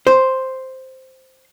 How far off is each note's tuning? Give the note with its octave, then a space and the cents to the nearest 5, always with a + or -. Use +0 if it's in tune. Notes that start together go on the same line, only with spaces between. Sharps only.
C5 +0